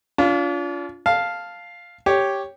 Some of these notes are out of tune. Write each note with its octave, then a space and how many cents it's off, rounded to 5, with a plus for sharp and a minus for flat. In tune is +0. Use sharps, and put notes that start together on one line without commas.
D4 -40 F4 +0
F5 +0 A5 +0
G4 +0 C#5 +0